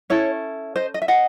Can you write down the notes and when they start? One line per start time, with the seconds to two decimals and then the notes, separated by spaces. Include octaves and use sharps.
0.10 C#4 E4 A4 C#5
0.76 C5 D#5
0.94 D#5
1.02 E5
1.08 D#5 F#5